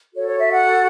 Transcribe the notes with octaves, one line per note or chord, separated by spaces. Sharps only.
F#4 A4 C#5
C#5
E5
F#5